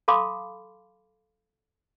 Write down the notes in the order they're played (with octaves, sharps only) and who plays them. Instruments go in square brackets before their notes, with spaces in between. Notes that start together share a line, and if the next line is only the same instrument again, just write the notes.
[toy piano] A4 F5 A5 B5 C6 D6